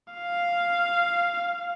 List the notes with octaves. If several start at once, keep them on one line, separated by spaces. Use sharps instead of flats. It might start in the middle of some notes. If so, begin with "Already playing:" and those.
F5